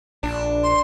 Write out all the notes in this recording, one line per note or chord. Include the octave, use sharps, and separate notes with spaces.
A#1 D4
C6